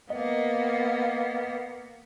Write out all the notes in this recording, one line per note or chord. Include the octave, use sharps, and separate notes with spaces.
A#3 B3 D#5